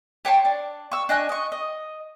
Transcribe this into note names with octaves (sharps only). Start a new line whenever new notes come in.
G4 C#5 A5 C6
D4
C#6 E6
D4 D#5 G#5 F#6
D#5 C#6
D#5